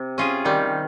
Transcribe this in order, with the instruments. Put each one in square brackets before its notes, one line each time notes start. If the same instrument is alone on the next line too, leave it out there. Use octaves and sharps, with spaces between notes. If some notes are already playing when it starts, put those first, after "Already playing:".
Already playing: [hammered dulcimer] C3
[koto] C#4 F4 G#4
[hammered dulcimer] D#3 [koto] G3